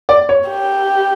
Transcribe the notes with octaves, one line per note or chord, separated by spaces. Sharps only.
D5
C#5
G4